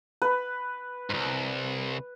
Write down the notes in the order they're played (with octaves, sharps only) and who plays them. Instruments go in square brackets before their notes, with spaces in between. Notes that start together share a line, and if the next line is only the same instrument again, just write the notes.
[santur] B4
[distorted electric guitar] C2 G#2